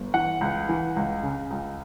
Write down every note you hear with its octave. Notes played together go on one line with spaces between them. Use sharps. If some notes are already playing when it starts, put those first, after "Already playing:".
Already playing: G1
E3 F#5
C#2
E3
C#2
C#3
C#2